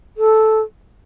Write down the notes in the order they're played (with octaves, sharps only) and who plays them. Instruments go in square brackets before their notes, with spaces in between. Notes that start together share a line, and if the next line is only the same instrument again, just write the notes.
[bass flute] A4